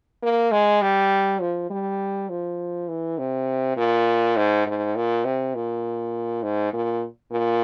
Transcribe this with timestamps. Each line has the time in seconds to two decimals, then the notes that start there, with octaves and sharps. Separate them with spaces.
0.22 A#3
0.52 G#3
0.82 G3
1.41 F3
1.70 G3
2.29 F3
2.88 E3
3.18 C3
3.77 A#2
4.37 G#2
4.66 G#2
4.96 A#2
5.25 C3
5.55 A#2
6.43 G#2
6.73 A#2
7.31 A#2